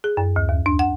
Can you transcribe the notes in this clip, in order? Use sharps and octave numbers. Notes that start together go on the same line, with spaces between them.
G#4
F#2
D2
D#2
D4
F#5